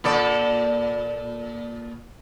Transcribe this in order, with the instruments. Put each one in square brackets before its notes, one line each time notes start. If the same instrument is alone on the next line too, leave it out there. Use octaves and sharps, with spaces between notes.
[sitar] A#2 A4 D5